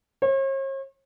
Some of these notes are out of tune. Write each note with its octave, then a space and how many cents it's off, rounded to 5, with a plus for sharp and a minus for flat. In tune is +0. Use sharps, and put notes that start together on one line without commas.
C#5 -45